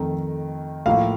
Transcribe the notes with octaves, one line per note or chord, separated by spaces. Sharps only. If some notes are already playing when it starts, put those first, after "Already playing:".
Already playing: F2 D#3 A3
A2 F3 A#3 F5